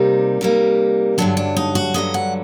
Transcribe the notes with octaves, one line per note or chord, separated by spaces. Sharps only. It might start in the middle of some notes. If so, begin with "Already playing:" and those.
Already playing: C3 G3 A#3 D#4
C3 G3 A#3
G2 D3 F#3 D4
D4
D#4
F#4
G2 D3 F#3 D#5
F#5